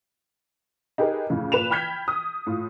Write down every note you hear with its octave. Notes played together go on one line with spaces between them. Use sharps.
D#4 G4 G#4 A#4 B4
F2 A2 C#3
A#2 B4 E7 F7
G5 B5 F6 G6 G#6 B6
D#6
A2 F4